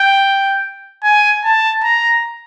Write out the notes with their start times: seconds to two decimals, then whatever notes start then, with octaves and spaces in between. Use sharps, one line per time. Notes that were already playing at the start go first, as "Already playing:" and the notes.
Already playing: G5
1.04 G#5
1.44 A5
1.84 A#5